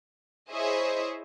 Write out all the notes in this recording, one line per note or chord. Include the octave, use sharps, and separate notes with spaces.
E4 G#4 C5 C#5 D#5 E5